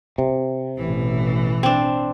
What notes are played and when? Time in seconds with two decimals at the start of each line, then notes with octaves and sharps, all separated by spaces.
0.18 C3
0.78 A1 B2 E3
1.63 C4 D4